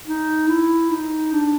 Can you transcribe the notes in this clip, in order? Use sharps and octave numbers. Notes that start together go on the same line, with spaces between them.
D#4
E4
D#4
D4